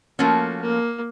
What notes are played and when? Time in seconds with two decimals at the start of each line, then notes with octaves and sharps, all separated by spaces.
0.19 F3 A3 A#3 C#4 F#4
0.61 A#3